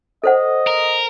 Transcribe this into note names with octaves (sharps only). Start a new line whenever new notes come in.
A4 C5 D#5 F#5
A#4